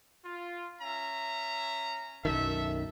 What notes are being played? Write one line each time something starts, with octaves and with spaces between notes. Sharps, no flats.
F4
C#4 E5 A#5
B1 F#2 D#3 A4 E5